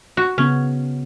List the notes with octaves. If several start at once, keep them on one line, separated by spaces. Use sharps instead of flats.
F#4
C#3 B3 C#4